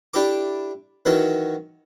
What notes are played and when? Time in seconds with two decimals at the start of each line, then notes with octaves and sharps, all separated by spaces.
0.14 D4 E4 G4 A4 D6
1.05 D#3 E3 F#3 C#4 A4